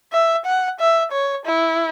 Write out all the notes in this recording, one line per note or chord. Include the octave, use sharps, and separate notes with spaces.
E5
F#5
E5
C#5
E4